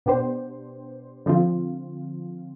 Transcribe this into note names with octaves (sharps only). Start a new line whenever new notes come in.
B2 B3 D4 G4 C5
D3 F3 C4 F4